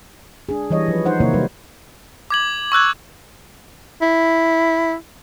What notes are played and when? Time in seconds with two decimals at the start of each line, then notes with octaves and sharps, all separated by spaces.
0.49 D4 G#4
0.70 E3 G3 C#5 D#5
0.88 F3 B4
1.06 D#4 C5 F#5
1.20 C3 D#3 A#3 E4 C#5
1.34 F#3 G3 D#4 B4
2.30 D6 G#6 F#7
2.72 C#6 E6 F#6 G#6
4.01 E4